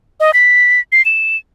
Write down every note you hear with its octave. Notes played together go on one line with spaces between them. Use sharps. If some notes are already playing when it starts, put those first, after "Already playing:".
D#5
B6
C7
E7